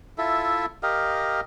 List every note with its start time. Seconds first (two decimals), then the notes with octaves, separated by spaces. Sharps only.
0.18 E4 F4 A4 E5
0.83 G4 A#4 D#5 F5